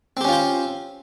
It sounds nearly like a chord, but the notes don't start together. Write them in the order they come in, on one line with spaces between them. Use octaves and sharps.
C4 G4 C#4 F4 C5